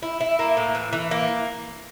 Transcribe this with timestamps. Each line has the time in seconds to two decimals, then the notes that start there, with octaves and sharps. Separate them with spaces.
0.03 E4
0.21 E4
0.39 A#3
0.57 A2
0.75 E3
0.93 E3
1.11 A#3